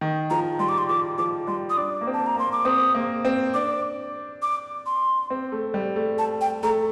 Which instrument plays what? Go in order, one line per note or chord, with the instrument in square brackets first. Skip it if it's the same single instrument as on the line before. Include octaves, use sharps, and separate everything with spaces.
[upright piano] D#3
[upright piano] F3 [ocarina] A#5
[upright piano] G3 [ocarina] C6
[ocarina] D6
C6
[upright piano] F3 [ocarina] D6
[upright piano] F3 [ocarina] D6
[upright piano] G3 [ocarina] C6
[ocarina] D#6
[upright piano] D4 [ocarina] D6
[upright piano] A#3
C4
[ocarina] A5
A#5
[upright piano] A#3 [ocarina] C6
[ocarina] D6
[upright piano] C4 [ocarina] D#6
[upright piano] A#3
C4
[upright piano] D4 [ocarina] D6
[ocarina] D6
C6
[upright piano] C4
A3
G3
A3
[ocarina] A5
G5
[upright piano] A3 [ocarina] A#5